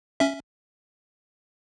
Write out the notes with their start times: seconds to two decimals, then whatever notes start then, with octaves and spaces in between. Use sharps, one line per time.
0.20 C#4 E5